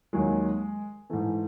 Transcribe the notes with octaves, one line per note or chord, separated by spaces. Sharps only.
D#2 D#3 F#3 G#3
G#2 E3 A3